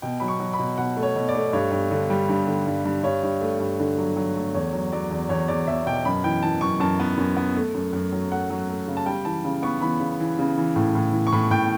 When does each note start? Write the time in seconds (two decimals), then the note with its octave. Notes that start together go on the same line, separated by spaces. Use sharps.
0.02 B2 G5
0.20 F#3 B5
0.28 C#6
0.40 F#3
0.53 B5
0.60 B2
0.78 B2 F#5
0.97 A3
1.03 C#5
1.16 B2
1.29 D5
1.35 A3
1.53 G2 C#5
1.71 G2
1.91 D3
2.10 G3
2.29 G2
2.47 D3
2.67 G2
2.85 G2
3.03 G2 C#5
3.23 G2
3.41 A3
3.60 G2
3.80 D3
3.98 F#3
4.16 F#3
4.36 A3
4.54 E2 C#5
4.73 F#3
4.92 F#3 D5
5.11 E2
5.29 E2 C#5
5.48 E2 D5
5.67 E2 E5
5.86 B2 G5
6.05 F#2 B5
6.24 E3 G5
6.43 E3 A5
6.61 F#2 C#6
6.80 F#2 A5
7.00 B3
7.17 F#2
7.37 B3
7.56 A3
7.74 F#2
7.93 F#2
8.12 F#3
8.31 A3 F#5
8.50 F#3
8.69 A3
8.88 C#3
8.97 A5
9.06 G3 G5
9.25 E3 A5
9.45 C#3
9.62 B3 C#6
9.82 E3 B5
10.00 C#3
10.20 E3
10.39 C#3
10.58 E3
10.76 A2
10.95 A2
11.13 E3
11.27 C#6
11.32 A2 B5
11.51 A2 G5